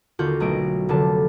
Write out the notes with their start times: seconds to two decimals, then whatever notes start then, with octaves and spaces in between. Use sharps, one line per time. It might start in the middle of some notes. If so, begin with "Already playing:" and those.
0.19 D#2 D3 F4 F#4 G6
0.40 B1 A3 D#5 D7
0.89 F1 D3 A5